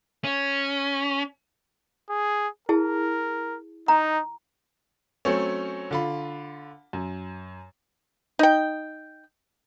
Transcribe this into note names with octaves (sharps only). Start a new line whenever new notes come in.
C#4
G#4
E4 G#4 A#4 A5
D#4 A#5
F#3 A3 C4 C#4
D3 F4 B5
F#2
D#4 G5